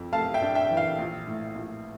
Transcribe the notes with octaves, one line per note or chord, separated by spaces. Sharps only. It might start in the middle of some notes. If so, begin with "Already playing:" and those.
Already playing: F2
A3 F5 A5
E5 G5
D4
E5 G5
E3
F5
A#1
A2
A#1